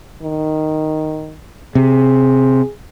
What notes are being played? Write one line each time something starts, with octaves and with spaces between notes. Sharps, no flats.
D#3
C3 G#4